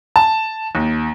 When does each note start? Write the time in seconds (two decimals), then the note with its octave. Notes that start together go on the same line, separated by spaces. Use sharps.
0.16 A5
0.75 D#2